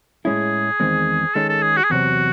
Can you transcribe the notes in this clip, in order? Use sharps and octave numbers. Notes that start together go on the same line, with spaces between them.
A2 G#3 C#4 E4 G#4
E2 D#3 G#3 C4
D#3 G#3 C#4 A4
A4
G#4
F#4
G#4
E2 C3 F#3 F#4